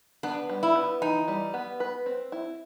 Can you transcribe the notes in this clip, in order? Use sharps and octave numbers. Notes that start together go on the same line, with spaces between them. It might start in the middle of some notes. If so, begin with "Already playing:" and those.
B3 D4
G3
E4
B3
E3 D#4
G3
B3
B4
C4
E4